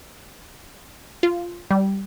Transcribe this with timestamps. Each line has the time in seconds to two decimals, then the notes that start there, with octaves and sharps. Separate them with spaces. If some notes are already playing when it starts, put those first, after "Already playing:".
1.23 F4
1.71 G3